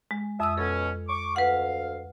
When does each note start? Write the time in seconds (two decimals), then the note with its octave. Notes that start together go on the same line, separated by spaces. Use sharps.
0.11 G#3
0.40 F2 E5 D#6 E6
0.58 B2 C#4 A4
1.09 C#6 D6
1.36 D2 B4 F5 F#5